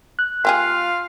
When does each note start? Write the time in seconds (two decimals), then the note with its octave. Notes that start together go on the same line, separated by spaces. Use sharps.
0.19 F#6
0.45 A#3 F4 G4 G#4 F5